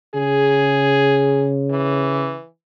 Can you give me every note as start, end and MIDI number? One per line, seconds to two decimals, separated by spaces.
0.14 2.36 49
0.14 1.51 68
1.71 2.46 52